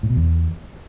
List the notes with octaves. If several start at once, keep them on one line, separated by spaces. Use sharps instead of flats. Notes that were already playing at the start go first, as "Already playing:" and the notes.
A2
B2
E2